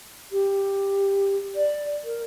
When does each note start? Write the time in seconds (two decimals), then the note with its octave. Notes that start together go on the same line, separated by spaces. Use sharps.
0.32 G4
1.56 D5
2.04 A#4